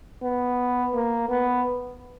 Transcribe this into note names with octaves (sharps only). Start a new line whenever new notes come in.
B3
A#3
B3